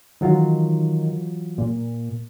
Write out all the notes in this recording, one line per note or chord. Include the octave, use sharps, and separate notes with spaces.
D#3 E3 F#3 F4
A#2